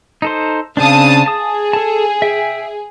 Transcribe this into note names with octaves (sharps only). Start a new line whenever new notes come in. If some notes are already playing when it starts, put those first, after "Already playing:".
D#4 A4 C5
C#3 C4 D4 F5 A5 D#6
G#4 A5 D#6
A4 A5
E5 G5